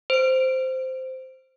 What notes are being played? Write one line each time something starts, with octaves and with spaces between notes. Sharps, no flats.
C5 D7